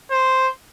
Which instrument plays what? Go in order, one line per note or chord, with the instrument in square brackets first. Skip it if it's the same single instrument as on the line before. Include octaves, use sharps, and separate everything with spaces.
[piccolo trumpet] C5